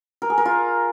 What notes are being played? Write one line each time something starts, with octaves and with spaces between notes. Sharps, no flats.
A#4
G#4
A#4
F4